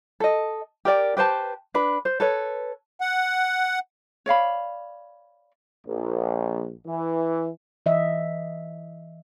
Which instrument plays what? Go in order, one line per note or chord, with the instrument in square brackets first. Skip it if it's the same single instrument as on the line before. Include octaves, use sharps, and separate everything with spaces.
[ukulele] A4 D#5
G4 A#4 D5 G5
G4 B4 C5 A5
D4 B4 B5
C5
A4 B4 C#5
[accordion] F#5
[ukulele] C#5 D5 F5 B5
[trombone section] A#1
E3
[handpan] E3 D#5 E5